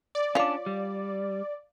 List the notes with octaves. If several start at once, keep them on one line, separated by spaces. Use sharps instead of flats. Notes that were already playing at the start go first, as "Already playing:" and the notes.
D5
C#4 D4 F4 C#5 F5 D6
G3